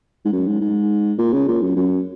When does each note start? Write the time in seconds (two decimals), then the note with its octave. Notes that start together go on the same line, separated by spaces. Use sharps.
0.25 G#2
0.32 F#2
0.47 G#2
0.61 G#2
1.18 A#2
1.33 C#3
1.48 A#2
1.62 F#2
1.76 F#2